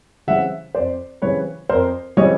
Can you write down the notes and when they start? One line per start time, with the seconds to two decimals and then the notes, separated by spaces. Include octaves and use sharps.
0.27 C#3 E3 G3 C4 E5 F#5
0.75 F2 C5 D5
1.22 C#3 E3 G3 C4 B4 C#5
1.69 F2 A#4 C5
2.17 C#3 E3 G3 C4 C#5 D#5